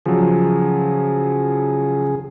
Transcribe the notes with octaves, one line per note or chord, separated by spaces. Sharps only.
C#3 F3 F#3 G#4